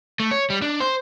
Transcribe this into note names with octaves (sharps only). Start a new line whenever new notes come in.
A3
C#5
G3
D4
C5